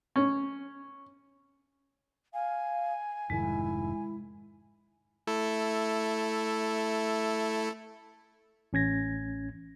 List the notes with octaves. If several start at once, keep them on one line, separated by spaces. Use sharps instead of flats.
C#4
F5 G#5
F1 G#2 D#3 G#3 E4
A3 E4 A4
A1 C#4 G#6 A#6